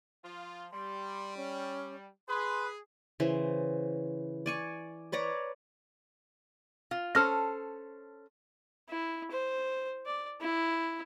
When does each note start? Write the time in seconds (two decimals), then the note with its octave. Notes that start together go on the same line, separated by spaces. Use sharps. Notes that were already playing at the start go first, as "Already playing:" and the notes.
0.24 F3 F4
0.72 G3 C6
1.37 C#4
2.29 G#4 B4 C6
3.20 C#3 E3 C5
4.46 D5 G#5 C#6
5.12 B4 C#5 D5 A#5
6.91 F4
7.15 C#4 A4 C5 F6 A#6
8.89 E4
9.30 C5
10.05 D5
10.41 E4